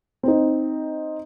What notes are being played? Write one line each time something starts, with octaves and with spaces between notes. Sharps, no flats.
C4 D#4